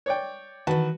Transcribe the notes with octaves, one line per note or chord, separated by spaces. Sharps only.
C#5 D5 G5
D#3 E3 F#4 B4 A5